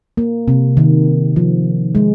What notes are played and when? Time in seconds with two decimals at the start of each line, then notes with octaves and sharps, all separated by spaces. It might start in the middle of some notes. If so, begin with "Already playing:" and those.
0.17 A#3
0.48 C3
0.77 D#3
1.36 F3
1.95 G#3